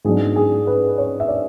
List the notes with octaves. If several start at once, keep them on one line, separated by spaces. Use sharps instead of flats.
G#2 F#3 B3 D4 G#4
G#4
B4
C#5
E5
D5